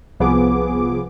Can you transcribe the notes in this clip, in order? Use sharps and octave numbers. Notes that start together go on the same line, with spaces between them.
C2 F3 B3 G#4 D6